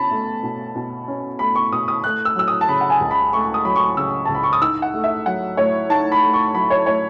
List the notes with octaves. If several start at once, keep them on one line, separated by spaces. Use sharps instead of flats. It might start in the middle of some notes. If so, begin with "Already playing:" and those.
Already playing: B2 C#4 A5 B5
A3
B2
B2
C#4
A3 B5
C#6
B2 D#6
D#6
A3 F#6
E6
F#3 E6
D#6
A5
C#3 B5
F#5
G#5
C#2
B5
A3 C#6
D#6
F#3 B5
C#6
C#3 E6
C#2 A5
B5
C#6
D#6
D#4 E6
F#5
A3
E5
F#3 F#5
A2 C#5
D#4 A5
B5
A3
C#6
F#3 B5
C#5
A2 C#5